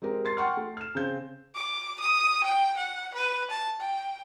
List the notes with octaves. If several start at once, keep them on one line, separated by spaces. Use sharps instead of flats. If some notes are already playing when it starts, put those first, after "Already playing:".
G#3 C4 G4 A#4
C6 A6 C7
F#5 G5 C6 C#6 F6
A3
F6 E7
C#3 C4 G6
D6
D#6
G5
F#5
B4
A5
G5